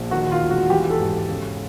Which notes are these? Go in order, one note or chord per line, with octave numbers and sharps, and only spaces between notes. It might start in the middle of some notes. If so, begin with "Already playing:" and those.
Already playing: A#1
D#3 F#4
F4
E1
F#4
E3 G4
A4
G#2
C#3